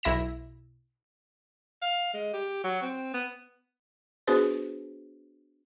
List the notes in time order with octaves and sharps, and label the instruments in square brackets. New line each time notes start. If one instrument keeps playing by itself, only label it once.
[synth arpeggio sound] B1 E4 A#6 E7
[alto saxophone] F5
G#3
G4
F#3
C4
B3
[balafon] B3 D4 F#4 G#4 B4 C5